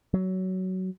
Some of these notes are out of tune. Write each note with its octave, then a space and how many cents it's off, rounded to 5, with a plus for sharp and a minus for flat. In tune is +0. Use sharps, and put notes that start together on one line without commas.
F#3 +15